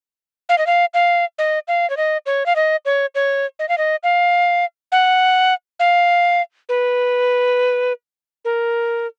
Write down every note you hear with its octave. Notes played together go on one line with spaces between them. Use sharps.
F5
D#5
F5
F5
D#5
F5
C#5
D#5
C#5
F5
D#5
C#5
C#5
D#5
F5
D#5
F5
F#5
F5
B4
A#4